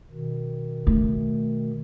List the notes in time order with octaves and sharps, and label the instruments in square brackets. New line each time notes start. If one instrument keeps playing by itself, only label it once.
[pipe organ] B2 D#3
[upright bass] A3